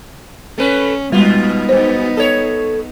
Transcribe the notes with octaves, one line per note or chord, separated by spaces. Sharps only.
A3 C#4 B4
A#2 G3 G#3 B3 D#4 F4
G2 B2 C5
A4 C#5